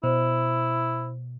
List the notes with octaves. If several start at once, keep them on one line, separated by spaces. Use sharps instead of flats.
B2 E4 C5